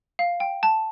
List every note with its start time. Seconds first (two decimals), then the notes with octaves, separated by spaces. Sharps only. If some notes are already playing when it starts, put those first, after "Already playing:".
0.19 F5
0.40 G5
0.63 A5